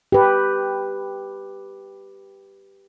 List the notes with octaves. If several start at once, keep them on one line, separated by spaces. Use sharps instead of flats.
G4 B4